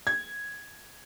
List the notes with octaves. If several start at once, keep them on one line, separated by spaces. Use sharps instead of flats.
G#6